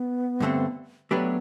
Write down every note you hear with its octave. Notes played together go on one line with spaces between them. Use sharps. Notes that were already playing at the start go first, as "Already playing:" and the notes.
Already playing: B3
G2 D3 A3 C4
F#3 A3 B3 D4 G4 B4